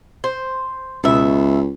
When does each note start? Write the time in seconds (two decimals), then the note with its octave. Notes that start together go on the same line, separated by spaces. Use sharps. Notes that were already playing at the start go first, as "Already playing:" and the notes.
0.24 C5
1.04 C#2 B2 E5